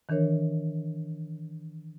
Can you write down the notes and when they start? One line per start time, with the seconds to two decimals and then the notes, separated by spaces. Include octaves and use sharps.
0.09 D#3 E3 D4 A#4 C#5